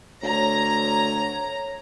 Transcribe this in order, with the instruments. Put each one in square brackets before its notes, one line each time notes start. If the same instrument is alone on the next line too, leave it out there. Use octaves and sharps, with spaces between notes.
[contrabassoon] D2 [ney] C#5 [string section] A#5